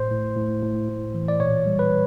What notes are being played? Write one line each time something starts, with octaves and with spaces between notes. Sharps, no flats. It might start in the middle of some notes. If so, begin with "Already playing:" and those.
Already playing: A2 C5
A2
A2
A2
A2
E3
D5
A#2 C#5
G3
B4